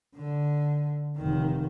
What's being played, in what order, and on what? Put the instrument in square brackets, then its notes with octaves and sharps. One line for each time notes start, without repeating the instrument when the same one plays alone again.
[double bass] D3
F1 D#3